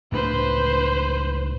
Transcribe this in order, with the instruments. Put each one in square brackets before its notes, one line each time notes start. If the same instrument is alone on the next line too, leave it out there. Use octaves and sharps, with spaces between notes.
[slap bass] C#2 A2 D4 [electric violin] B4 C5